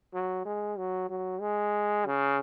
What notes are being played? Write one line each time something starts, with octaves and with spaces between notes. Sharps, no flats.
F#3
G#3
F#3
F#3
G#3
C#3